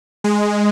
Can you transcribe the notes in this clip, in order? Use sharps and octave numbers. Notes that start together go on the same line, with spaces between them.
G#3